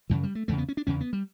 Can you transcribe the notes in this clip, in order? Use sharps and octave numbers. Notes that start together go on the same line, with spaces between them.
F#2 C#3 E3
G3
A3
E2 C#3 A3
B3
C#4
D4
E2 C#3 C#4
B3
G3